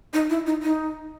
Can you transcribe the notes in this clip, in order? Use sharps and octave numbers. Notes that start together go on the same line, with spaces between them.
D#4
E4
D#4
D#4